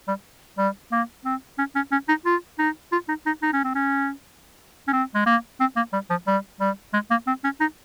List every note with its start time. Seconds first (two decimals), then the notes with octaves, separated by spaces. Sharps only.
0.08 G3
0.58 G3
0.92 A#3
1.25 C4
1.58 C#4
1.75 C#4
1.92 C#4
2.08 D#4
2.26 F4
2.59 D#4
2.92 F4
3.08 D#4
3.26 D#4
3.43 D#4
3.53 C#4
3.64 C4
3.75 C#4
4.88 C#4
4.93 C4
5.15 G#3
5.26 A#3
5.60 C4
5.76 A#3
5.93 G3
6.10 F3
6.27 G3
6.60 G3
6.94 G#3
7.10 A#3
7.27 C4
7.44 C#4
7.60 D#4